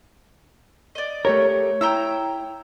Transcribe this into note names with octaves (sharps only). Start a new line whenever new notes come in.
D5 D#5
A3 G4 A#4 C#5
E4 G5 A#5 E6